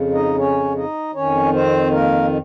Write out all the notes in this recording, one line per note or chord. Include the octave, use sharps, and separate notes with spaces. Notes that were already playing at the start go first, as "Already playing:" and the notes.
Already playing: F2 C#3
D#4 D#5
C#4 C#5
D#4 D#5
F2 D#3 C#4 C#5
C4 C5
A#3 A#4